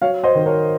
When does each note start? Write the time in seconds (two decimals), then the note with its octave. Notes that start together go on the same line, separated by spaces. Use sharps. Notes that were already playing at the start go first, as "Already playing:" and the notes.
0.02 F#3 C#5 F5
0.23 C5 D#5
0.35 D#3
0.46 A#4 C#5